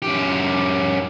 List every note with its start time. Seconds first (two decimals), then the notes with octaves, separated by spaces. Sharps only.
0.02 F#2 G4